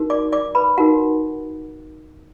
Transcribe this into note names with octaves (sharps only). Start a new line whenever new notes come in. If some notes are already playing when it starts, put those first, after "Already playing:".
Already playing: D#4 F#4 A#4
D5 D6
D5 D6
B4 B5
D#4 F#4 A#4 F#5